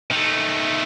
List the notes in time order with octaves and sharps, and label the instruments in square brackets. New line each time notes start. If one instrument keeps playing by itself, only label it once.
[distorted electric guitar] D#3 A3